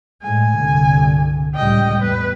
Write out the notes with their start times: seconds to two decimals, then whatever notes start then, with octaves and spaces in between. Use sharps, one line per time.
0.22 A2 G#3 G#5
0.56 C2 G2 D3
1.55 C#2 A2 G3 D#5 G5
2.02 E2 B4